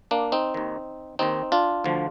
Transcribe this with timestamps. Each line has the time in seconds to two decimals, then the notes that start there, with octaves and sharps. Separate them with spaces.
0.11 A#3 D4
0.32 C4 D#4
0.54 D#2 D#3
1.19 D#2 D#3 C4 D#4
1.52 D4 F4
1.84 D2 D3 F3